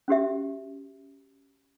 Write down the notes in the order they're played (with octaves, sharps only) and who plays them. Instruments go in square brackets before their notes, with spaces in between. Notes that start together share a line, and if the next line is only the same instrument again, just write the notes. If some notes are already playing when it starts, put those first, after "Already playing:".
[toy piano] C#4 F#4 G4 E5